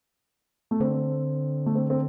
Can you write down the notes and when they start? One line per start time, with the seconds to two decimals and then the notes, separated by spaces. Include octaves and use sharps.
0.71 A3
0.80 D3 C4
1.66 A3
1.75 C4
1.90 C4